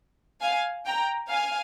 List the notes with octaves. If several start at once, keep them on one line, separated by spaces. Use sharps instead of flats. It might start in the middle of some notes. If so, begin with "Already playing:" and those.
F5 G#5
G5 A#5
F5 G#5